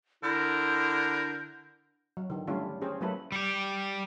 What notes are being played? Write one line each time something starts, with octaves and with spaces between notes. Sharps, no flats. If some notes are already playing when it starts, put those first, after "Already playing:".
D3 E4 A#4 G6
F#3
D3 D#3
G3 A3 C#4 D4 E4 F4
C#4 G4 G#4 C5
F#3 A3 A#3 E4 A4 B4
G3 G4